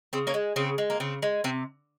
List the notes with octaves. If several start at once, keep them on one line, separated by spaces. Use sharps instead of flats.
C#3 C4
A#3 C#4
G#3
C#3 C4
G#3
A#3
C#3 C4
G#3
C3 C4